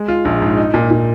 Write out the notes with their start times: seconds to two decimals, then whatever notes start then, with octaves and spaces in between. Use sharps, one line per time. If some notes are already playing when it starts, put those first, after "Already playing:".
Already playing: G#3
0.08 F4
0.25 A#1
0.42 G#2
0.57 D#4
0.74 A#2
0.91 A#2